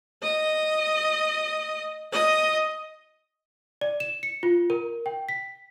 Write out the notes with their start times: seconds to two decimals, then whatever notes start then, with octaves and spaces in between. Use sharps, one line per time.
0.22 D#5
2.12 D#5
3.81 D5
4.00 E7
4.23 C#7
4.43 F4
4.70 A#4
5.06 G5
5.29 B6